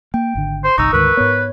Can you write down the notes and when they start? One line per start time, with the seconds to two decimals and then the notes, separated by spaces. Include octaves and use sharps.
0.14 A#3 G5
0.35 G#1 D3
0.64 C5
0.78 G1 C2 D#4 C#6 E6
0.93 D2 G#2 D#3 A#4 B4 C#6
1.17 G#2 B3 C#5